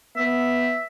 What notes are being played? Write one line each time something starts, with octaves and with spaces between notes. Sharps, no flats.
B3 E5